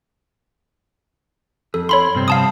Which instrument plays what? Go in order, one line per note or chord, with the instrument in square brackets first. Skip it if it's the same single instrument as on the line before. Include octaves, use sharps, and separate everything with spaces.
[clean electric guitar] F2 [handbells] A4
[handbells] C#5 B5 C6
[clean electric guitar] G2 C3 C4
[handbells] F5 A5 D#6